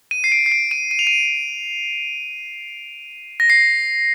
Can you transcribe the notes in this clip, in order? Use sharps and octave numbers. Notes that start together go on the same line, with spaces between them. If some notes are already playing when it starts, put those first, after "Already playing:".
D#7
C7
D7
C7
D7
D#7
D#7
F7
D#7
A#6
C7